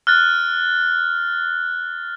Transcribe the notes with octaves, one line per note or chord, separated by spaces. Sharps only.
F6 F#6 A6